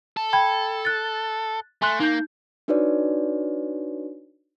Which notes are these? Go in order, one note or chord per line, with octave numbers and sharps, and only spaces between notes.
A4
G5 B5 G#6
F#6 A6
A3 G#5 C6 F#6
A#3 D#4 G6
D4 D#4 F#4 B4 C#5 D5